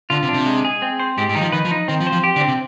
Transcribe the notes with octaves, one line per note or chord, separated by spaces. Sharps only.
D3 F4
C3
D4
C3
G#3
G#4
C4
C5
G#2 G4
G#2
D#3 D#4
F3
D#3 B4
F3
D#4
D#3 C4
F3
C5
F3
G4
D3
C4
C3